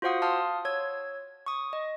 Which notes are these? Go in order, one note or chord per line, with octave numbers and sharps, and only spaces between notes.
F4 F#4 C5 F5 F#5 D#6
F5 A5 C6 D#6 F6
C#5 E6 G#6
C#6 D#6
D#5